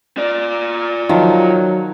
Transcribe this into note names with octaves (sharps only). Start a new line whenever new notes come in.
F4 D5
D#3 F3 F#3